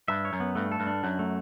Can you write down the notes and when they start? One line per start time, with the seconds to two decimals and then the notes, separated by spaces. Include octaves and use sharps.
0.08 G2 E5
0.25 C#5
0.33 F#2
0.40 B3
0.55 G2 A3
0.72 A4
0.80 G2
0.87 D4
1.03 F#2 F#3
1.19 A3